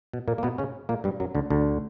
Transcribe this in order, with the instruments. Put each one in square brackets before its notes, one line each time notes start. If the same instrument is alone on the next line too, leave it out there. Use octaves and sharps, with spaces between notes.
[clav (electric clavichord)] B2
A#2 A#3
A#3
B2 B3
C#3 C#4
A#2 A#3
G2 G3
F#2 F#3
D2 D3
D2 D3